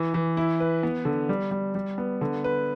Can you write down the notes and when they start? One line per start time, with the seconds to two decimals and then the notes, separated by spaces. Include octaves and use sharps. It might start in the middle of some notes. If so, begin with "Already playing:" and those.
Already playing: E3
0.14 E3
0.37 E4
0.60 B4
0.83 B3
1.05 D3
1.29 G3
1.51 G3
1.75 G3
1.98 B3
2.21 D3
2.44 B4